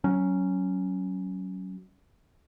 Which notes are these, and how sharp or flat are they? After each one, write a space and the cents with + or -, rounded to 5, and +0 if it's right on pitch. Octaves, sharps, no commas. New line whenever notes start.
F#3 +20 C#4 +0